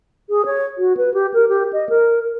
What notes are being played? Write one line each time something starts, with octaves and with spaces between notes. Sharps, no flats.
G#4
C#5
F#4
B4
G4
A#4
G4
D#5
A#4